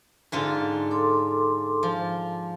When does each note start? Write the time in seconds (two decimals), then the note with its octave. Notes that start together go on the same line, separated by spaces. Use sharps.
0.32 G#2 D3 F4
0.91 A4 C6 D6
1.83 F3